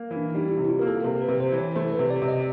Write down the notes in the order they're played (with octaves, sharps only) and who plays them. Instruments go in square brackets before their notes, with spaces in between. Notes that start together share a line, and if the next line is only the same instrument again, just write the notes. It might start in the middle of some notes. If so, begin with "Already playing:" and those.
Already playing: [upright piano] A#3
E3
[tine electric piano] D4
[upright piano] G3 [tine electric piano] D#4
[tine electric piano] E4
[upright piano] C3
[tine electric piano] F4
[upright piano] A#3 [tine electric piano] A#4
[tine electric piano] A4
[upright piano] C3 [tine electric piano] A#4
[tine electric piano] B4
[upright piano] C3
[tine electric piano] C5
[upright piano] E3
[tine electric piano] C#5
[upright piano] A3 [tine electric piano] C5
[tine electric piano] B4
[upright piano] C3
[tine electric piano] D5
[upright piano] C3
[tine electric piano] D#5